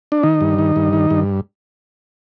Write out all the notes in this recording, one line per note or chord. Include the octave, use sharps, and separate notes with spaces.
D4
D#3 D#4
G2
D#3
G2
D#3
G2